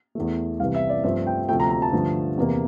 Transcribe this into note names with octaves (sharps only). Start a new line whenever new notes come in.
E2 E3 A3
C2 C3 E3 F5
E5
D5
G2 F3 A3 C4 E5
G5
D2 C3 F3 A3 G5
A#5
A#5
A5
G2 D3 F3 A3
E2 C3 E3 A#3